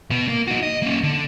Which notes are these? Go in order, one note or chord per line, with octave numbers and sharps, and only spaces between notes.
B2 B3
A#3
D#4 F#4
D#5
A#3 C#4
D3